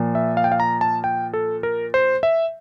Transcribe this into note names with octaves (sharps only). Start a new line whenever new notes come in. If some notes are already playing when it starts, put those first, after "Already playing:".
Already playing: A#2 F3
E5
F5
G5
F5
A#5
A5
G5
A4
A#4
C5
E5